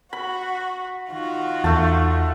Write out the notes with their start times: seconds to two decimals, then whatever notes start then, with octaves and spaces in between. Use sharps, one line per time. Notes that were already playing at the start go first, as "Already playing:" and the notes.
0.13 F#4 B5
1.10 D#3 F4 F#4
1.64 E2 A3 A5